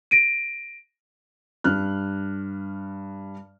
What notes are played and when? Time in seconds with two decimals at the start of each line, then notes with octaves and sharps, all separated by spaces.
0.11 A#6 D7 D#7
1.64 G2 F6 F#6